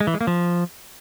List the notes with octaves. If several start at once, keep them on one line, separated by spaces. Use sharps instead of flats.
G#3
E3
G#3
A#3
F3